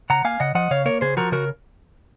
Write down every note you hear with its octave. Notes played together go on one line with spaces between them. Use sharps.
C#3 F#5 A#5
A#3 F5 G#5
C#3 D#5 F#5
F3 D#5 F#5
C#3 C#5 F5
A#3 A#4 C#5
C#3 G#4 C5
F3 F#4 A#4
C#3 F#4 A#4